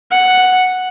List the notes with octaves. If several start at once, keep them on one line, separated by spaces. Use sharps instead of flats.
F#5